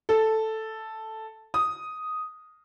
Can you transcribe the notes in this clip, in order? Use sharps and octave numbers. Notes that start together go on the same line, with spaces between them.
A4
D#6